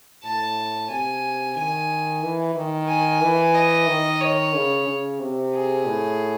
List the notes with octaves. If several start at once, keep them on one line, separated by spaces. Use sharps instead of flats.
A2 A5
C3 G#5
D#3 G#5
E3
D#3
G#5
E3
D#5
D#3
C#5
C#3
C#3
C3
G#4
A2